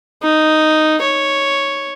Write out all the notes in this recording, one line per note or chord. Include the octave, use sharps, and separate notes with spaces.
D#4
C#5